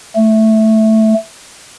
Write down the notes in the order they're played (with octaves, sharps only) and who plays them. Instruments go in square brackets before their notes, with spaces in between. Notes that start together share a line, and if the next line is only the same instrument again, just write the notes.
[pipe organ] A3